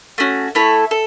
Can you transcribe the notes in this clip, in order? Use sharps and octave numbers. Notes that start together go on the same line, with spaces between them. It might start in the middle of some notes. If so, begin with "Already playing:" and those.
A3 C#4 F#4
A3 E4 A4 C#5
A4